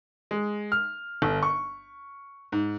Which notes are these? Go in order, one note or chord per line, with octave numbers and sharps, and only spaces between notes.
G#3
F6
G1
C#6
G#2